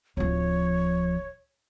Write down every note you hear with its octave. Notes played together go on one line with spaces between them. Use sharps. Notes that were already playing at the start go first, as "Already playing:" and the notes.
D1 F3 C#5